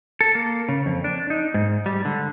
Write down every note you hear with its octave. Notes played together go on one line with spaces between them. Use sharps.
A4
A#3
C#3
F2
D4
D#4
G#2
G3
D3